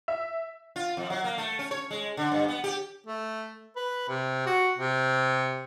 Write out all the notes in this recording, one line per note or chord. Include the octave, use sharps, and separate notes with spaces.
E5
F4
F2
F#3
A#3
A3
C#4
C#5
G#3
D3
G2
B3
G4
A3
B4
C3
F#4
C3